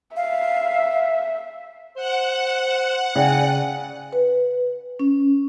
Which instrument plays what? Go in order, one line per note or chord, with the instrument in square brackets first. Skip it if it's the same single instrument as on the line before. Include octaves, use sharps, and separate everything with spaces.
[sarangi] E5 [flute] F5
[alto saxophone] C5 [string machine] F#5
[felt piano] C#3 [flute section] D5 G5 G#5
[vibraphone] B4
C#4